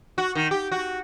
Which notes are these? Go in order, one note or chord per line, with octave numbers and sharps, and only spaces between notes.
F#4
D#3
G4
F#4